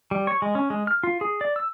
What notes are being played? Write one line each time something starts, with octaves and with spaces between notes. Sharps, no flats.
G3
C#5
G#3
C#4
G#3
F6
F4
G#4
D5
E6